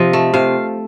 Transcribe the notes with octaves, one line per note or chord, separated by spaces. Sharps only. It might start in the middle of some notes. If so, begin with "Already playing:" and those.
Already playing: C3 F3 D#5
A3
C3 F5